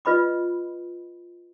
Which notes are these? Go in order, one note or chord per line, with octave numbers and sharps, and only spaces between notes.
F4 B4 D#5 B5 D6